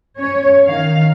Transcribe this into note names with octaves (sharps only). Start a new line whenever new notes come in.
C#4 C#5
D#3 F5